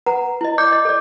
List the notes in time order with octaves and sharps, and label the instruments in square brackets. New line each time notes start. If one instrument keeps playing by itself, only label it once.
[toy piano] B4 F#5 A#5
E4 D#5
[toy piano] D5 [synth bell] D6 G6
[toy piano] D#5
A4 D5